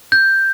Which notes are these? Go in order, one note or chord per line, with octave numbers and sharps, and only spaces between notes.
G6